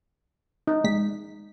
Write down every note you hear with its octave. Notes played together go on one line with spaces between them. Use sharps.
D#4
A#1 G#3 B6